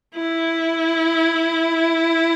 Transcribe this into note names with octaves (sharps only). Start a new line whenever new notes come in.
E4